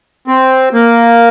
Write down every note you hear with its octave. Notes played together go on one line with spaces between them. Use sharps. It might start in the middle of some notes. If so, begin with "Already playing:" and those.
C4
A#3